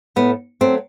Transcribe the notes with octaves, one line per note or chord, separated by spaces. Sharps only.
A2 B3
F#3 A3 C4